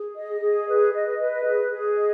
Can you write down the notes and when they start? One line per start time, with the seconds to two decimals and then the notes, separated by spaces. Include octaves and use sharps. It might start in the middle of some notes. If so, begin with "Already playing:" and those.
Already playing: G#4
0.15 D#5
0.40 G#4
0.67 B4
0.92 D#5
1.18 B4
1.44 G#4
1.70 G#4
1.96 D#5